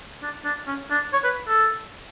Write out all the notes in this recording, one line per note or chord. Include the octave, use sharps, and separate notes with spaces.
D4
D4
C#4
D4
C#5
B4
A4